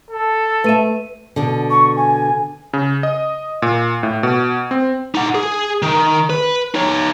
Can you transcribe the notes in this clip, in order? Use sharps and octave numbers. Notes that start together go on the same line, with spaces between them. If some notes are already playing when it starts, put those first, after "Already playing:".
A4
A3 B4 E5 D#7
B2 D3
C#6
G#5
C#3
D#5
A#2
A2
B2
C4
D#4 F#5
G#4
D#3
B4
D#4 C#5